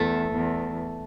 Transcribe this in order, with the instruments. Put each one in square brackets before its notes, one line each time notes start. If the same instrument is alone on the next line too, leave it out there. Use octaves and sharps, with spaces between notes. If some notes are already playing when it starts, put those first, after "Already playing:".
Already playing: [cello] E2 [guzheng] A3
[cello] E2